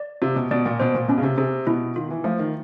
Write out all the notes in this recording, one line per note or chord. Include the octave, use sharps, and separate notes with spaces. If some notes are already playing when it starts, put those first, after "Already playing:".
Already playing: D5
C3 F4
B2
B2 D5
A#2
B2 C5
A#2
B2 C#4
C#3
C3
C3 G#4
B2 E4
D#3 F4
E3
F3 A3
D#3